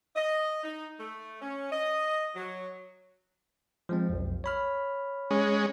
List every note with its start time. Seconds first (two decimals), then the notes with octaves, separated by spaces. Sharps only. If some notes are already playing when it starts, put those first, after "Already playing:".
0.15 D#5
0.63 D#4
0.98 A3
1.41 C#4
1.71 D#5
2.35 F#3
3.89 F3 G#3 C4
4.09 B1 F2
4.44 C#5 B5 F6
5.31 G#3 C#4